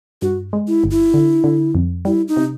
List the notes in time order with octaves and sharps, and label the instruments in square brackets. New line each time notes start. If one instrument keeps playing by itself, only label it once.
[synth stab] G2 [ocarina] F#4
[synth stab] G#3
[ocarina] E4
[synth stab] G1
[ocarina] E4
[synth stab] D3
D3
F2
[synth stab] G3 [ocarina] E4
[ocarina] D#4
[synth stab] C3